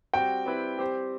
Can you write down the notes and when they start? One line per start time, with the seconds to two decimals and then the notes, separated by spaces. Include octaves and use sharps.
0.14 G3 C4 F#4 G5
0.46 G3 C4 E4 B4
0.77 G3 C4 G4 C5